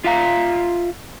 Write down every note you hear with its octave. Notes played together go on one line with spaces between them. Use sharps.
F4 E5 F5 A#5